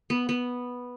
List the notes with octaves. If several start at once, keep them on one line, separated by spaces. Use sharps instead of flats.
B3
B3